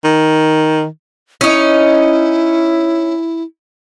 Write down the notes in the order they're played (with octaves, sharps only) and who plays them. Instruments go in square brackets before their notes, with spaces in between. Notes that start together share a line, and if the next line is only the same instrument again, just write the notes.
[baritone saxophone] D#3
[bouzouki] C#4 D#4 [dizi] E4